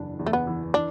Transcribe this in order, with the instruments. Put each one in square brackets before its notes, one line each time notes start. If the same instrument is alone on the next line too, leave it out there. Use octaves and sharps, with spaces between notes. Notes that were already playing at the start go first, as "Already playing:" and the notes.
Already playing: [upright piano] F#1 E2 E3 D4
E2
[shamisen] A3
B3
[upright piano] E3
[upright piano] E3 [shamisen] D4